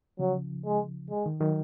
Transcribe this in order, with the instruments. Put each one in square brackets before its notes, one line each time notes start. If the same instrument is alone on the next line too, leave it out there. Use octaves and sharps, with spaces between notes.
[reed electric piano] C#3 F3 [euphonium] F#3
[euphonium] G#3
G#3
[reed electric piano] D#3
D#3 F#3